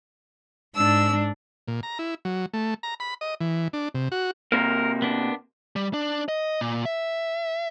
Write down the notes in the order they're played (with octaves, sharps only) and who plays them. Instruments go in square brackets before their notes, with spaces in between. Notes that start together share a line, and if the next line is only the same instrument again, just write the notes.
[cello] G#2 D4 [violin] E6
[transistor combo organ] A#2
A#5
E4
F#3
A3
A#5
B5
D#5
E3
D4
C3
F#4
[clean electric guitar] C3 A#3 [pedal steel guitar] A#4
[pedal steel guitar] B3 D4
[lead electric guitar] G3
D4
D#5
A#2
E5